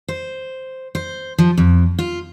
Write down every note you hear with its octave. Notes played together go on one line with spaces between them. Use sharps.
C5
C5
F3
F2
F4